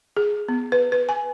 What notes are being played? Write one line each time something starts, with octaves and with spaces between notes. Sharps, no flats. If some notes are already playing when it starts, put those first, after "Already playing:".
G#4
B3
B4
B4
G#5